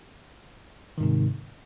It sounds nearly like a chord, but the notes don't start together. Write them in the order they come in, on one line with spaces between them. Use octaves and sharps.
D#3 G#2 C3